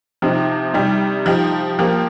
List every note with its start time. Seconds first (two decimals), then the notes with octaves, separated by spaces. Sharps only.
0.22 C3 F3 C4 D#4
0.74 C3 G3 D#4 G4
1.26 F3 D#4 G4
1.79 F3 A#3 G4